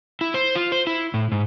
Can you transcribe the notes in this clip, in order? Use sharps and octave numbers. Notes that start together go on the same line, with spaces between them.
E4
C5
F4
C5
E4
A2
G#2